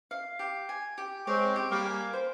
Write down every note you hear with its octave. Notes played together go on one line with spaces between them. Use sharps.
F5
G4
G#5
G4
G#3 C4 C#5
G4
G3 A#3
G#5
C5